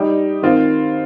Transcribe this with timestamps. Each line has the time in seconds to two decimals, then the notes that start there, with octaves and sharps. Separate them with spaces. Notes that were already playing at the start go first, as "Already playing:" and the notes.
Already playing: G3 D#4 G4
0.42 D#3 C4 F4